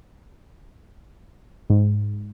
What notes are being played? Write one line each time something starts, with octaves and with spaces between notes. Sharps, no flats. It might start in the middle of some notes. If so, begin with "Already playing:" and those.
G#2